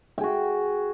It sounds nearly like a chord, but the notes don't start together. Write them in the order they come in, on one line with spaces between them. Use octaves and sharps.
G5 G#4 F#4